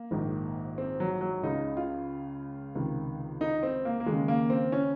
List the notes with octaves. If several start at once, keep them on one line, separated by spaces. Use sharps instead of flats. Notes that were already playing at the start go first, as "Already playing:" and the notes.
Already playing: A#3
A#1 G#2 D#3
C4
F#3
F#3
C#2 C#3 D#4
F4
C#2 C3 D#3
D#4
C4
A#3
A#3
D#2 C#3 G#3
A#3
C4
C#4